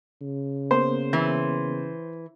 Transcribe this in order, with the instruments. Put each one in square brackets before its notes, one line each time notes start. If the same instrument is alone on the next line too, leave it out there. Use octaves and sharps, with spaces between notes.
[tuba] C#3
[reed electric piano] A#3 B3 A#4 [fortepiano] C5
[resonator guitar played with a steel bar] E3